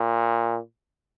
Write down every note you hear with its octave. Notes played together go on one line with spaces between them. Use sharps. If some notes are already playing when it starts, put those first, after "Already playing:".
Already playing: A#2